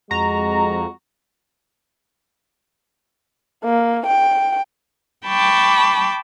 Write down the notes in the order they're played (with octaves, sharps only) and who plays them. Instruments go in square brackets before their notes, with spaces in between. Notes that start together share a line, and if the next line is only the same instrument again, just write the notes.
[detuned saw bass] F2 [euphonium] G#3 [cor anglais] F#4 [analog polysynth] A#5
[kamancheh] A#3
G5
[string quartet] G5 A5 B5 C#6 D6